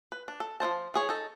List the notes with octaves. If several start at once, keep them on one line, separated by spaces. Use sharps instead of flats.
B4
D4
A4
F3 E4 C5 A5
E3 G#4 C#5
D#4 A4